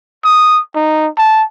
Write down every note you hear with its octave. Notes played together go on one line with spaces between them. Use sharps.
D#6
D#4
A5